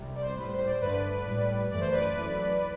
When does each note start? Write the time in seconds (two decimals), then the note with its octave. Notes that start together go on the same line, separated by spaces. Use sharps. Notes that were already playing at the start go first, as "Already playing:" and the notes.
Already playing: C2 C3 G3
0.15 D5
0.21 C5
0.36 A2 G3 B4
0.48 C5
0.58 C5
0.66 D5
0.70 C5
0.81 G2 D3 A3 B4 D5
1.26 A2 G3
1.71 F#2 E3 A3 D5
1.81 C5
1.91 B4 D5
2.16 F#2 E3 A3